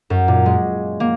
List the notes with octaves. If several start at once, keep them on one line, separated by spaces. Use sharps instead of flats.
F#2
A#2
G#3
A#3